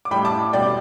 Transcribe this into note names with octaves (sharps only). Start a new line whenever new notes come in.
D6
A2 G3 G5 B5
A5 D6
B2 G3 D5 G5